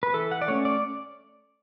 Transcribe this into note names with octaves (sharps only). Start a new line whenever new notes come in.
B4
E3 A4
F#5
D5
A3 C#4 C#5
D5